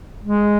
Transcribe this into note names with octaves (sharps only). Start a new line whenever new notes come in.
G#3